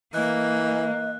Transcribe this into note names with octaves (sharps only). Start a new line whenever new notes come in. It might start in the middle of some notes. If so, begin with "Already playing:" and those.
E3 A#3 D#5 F#6